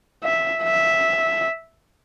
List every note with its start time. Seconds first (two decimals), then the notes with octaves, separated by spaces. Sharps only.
0.24 E5
0.63 E5